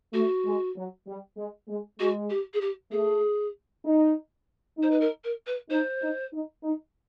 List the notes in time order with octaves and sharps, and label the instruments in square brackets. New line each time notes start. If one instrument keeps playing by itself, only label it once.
[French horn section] A3 [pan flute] F#4
[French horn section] G#3
F#3
G3
G#3
G#3
[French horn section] G#3 [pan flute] F#4
[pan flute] G4
G#4
G4
[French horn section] A3 [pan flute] G#4
[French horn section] D#4
D#4
[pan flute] C5
B4
A#4
A#4
B4
[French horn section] D#4 [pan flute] C5
[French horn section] D#4
D#4
D#4